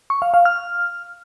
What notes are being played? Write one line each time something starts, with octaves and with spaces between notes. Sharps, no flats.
C#6
F5
F5
F6